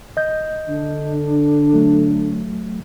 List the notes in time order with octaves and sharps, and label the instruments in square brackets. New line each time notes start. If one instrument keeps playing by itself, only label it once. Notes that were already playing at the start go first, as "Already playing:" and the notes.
[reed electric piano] D#5 G6
[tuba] D3 [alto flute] D4
[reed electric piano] F#3 A3